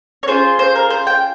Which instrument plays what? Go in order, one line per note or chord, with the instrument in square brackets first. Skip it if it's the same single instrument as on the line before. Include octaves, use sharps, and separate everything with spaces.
[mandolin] C#5
C#4 F4 G#4 C5
C5
A#4
C5
G5